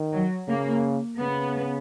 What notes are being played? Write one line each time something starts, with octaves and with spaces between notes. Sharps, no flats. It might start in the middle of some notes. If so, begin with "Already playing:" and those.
Already playing: D#3
F#3
C#3 A#3
C#3 B3